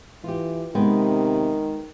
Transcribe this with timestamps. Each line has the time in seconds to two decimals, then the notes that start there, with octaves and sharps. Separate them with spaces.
0.24 E3 F4 G4
0.75 C3 D#3 G#3 B3 G5